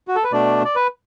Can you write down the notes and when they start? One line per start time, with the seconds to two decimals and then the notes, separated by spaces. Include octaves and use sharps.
0.08 F#4
0.16 A4
0.24 B4
0.32 B2 A3 D4 D5
0.65 D5
0.76 B4